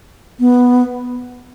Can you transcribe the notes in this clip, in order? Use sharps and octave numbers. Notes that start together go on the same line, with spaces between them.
B3